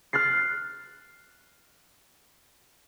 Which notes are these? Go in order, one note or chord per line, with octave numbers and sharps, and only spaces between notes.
F6 F#6 A6 C7